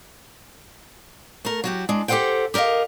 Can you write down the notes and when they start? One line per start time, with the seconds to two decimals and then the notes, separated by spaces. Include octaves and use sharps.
1.45 A3 A#4
1.64 F#3 F#4 G4
1.89 G#3 D4
2.08 G4 A4 B4 C5 F#5 G5
2.54 G4 A#4 D5 D#5 F5